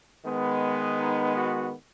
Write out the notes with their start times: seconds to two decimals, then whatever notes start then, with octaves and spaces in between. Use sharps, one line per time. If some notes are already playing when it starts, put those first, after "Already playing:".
0.24 D#3 G#3 B3
1.00 D#4
1.38 F#4